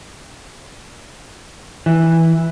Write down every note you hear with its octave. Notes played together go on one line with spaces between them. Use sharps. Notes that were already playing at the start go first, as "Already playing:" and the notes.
E3